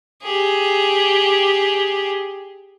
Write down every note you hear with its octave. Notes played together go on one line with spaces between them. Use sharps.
G4 G#4